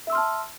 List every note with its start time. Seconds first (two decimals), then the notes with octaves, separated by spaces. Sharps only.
0.07 E5
0.10 E6
0.12 C6
0.15 F6
0.18 A5